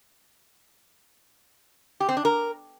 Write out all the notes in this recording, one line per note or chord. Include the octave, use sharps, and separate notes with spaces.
G4
C4
D4
A#4